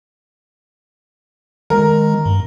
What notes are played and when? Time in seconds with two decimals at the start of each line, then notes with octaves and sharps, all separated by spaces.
1.70 D#3 G#3 A#4
2.26 G2